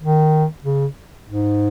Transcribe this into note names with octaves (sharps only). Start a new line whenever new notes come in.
D#3
C#3
G#2